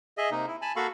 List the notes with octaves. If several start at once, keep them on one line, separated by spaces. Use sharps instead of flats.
G#4 D#5 E5
C3 A#3 D#4
E4
G#5 A5 B5
A#3 F#4 A4 F5 B5 C#6